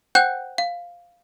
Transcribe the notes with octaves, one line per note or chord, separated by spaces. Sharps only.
C5 F#5 G5 F#6 G6
F5